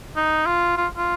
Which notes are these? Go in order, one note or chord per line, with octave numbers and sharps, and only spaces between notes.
D#4
F4
F4
F4